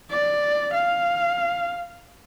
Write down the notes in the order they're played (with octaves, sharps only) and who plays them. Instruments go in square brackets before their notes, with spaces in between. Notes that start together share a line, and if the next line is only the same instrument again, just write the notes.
[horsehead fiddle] D5
F5